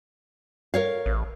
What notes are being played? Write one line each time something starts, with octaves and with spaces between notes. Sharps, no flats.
A#4 C#5 F5
A1